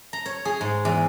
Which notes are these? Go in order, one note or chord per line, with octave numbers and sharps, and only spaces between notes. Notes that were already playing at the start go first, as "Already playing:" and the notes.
A#5
C#5
G#4
G#2
E2